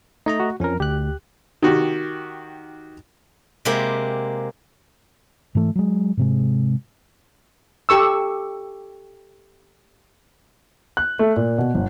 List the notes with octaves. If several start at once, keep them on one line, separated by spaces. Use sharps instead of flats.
A3 D#4 D#5 A#5
F#4
F2 F3 C#4 A#4
D2 G4 F#6
D#3 F#4 G4
C3 G#3 A#3 G4 B5
G#2 E3 A3
F#3 G#3
G#2 C3 G#3
G4 A4 C#6 E6
F#6
A3
A#2
B2
G1